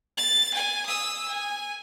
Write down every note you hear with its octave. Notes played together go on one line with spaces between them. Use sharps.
A6
G#5
D#6 E6
G#5